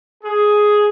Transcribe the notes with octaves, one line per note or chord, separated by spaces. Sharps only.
G#4